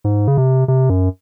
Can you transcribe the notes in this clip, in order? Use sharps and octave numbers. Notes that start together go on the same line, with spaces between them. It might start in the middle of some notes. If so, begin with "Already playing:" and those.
G#2
C#3
C3
C3
F#2